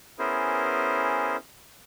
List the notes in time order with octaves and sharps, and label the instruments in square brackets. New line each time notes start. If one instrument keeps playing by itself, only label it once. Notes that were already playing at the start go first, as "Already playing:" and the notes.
[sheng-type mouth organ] B3 C#4 E4 G#4 A#4 C5